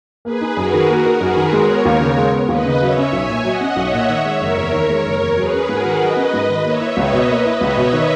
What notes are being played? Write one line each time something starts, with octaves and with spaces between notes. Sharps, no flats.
A#3 G#4 B4
D#4
F#2 F#4 A#4
D#3
A#3 F#4 A#4
D#4
F#2 G#4 B4
D#3
G#3 A#4 C#5
B3
D#2
C#3
G#3
B3
D#2 B4 D#5
C#3
F#3 C#5 E5
C#4
B1 E5 G#5
A#2
F#3 D#5 F#5
C#4
B1 C#5 E5
A#2
D#3
G#3
F#1 A#4 C#5
E2
D#3
G#3
F#1
E2
F#3 G#4 B4
C#4
G#2 F#4 A#4
D#3
F#3 B4 D#5
C#4
G#2
D#3
A#3 C#5 E5
E4
C#2 B4 D#5
B2
A#3 B4 D#5
E4
C#2 C#5 E5
B2
D#3